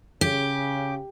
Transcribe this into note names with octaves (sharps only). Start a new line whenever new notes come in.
C#3 G4